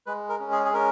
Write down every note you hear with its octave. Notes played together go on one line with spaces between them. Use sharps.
G#3 B4
A#4
C#4
G#4
G#4
C#4 A#4